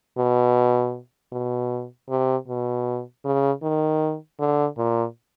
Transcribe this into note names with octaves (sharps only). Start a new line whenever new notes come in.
B2
B2
C3
B2
C#3
D#3
D3
A#2